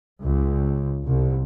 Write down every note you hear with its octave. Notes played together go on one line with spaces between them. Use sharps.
C#2
C2